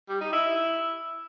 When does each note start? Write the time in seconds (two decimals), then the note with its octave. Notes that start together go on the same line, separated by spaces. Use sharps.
0.09 G3
0.21 D#4
0.33 E4